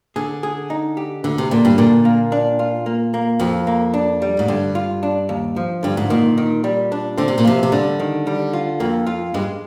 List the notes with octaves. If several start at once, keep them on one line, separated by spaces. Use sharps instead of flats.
D3 G#4
G#4
D#4
G4
D2 D3
C3
A#2 D3
G2
A#2 D3
A#3
D4
F4
A#3
A#3
F2 F3
A#3
D4
G3
G#2
G2 D3
F4
D4
D#2
F3
G2 D3
G#2
A#2 D#3
D#3
G3
D4
D3 C4
C3
A#2
C3 F3
C3
D3 G3
D#3
G3
F4
F2 A#3
F4
G2 G#3